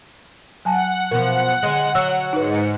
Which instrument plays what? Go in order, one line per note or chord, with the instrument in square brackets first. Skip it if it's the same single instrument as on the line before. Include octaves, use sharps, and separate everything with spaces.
[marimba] F#3 G#5 A5 [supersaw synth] F#5
[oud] B2 F3 [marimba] A#4 [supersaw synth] F#5
[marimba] D3 [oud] G#3
[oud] F#3 [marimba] E6
[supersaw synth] G#2 C#7 [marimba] D#4 B4